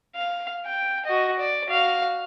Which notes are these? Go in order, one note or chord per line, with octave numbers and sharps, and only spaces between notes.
F5
G5
F#4 D#5
D5
F#4 F5